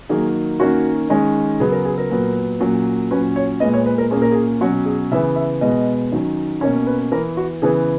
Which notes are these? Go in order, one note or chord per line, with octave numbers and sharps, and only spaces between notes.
D#3 F#3 A#3 G#4
D#3 A#3 C#4 F#4
D#3 G#3 C#4
C#3 F#3 B3 G#4
A#4
G#4
A#4
A#2 F#3 B3
A#2 F#3 A#3 C#4
A#2 F#3 C#4 B4
C#5
A#2 G#3 B3 D#5
C#5
B4
A#4
A#2 A#3 C#4 G#4
A#4
G#4
B2 F#3 C#4 F#4
G#4
C#3 E3 B3 E5
E5
B2 G#3 B3 D#5
D#3 F#3 C#4
B2 A#3 C#4 C#5
B4
E3 B3 A#4
F#4
C#3 E3 B3 G#4